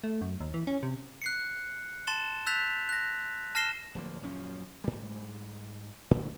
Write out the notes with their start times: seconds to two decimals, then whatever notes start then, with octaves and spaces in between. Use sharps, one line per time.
0.04 A3
0.22 F#2
0.40 D#2
0.54 E3
0.67 C#4
0.83 C3
1.22 F#6 C7 C#7
2.07 A5 C6 A6 E7 G7
2.46 E6 F#6 G6 A6 B6 F7
2.89 F#6 A#6
3.55 A5 F6 A#6 C7 E7 G7
3.95 D1 F3 A#3
4.22 D#1 F#2 F3 C#4
4.84 G#2 G3
6.11 A2 D3 D#3 A3